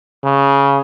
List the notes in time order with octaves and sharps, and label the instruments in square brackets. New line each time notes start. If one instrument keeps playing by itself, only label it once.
[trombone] C#3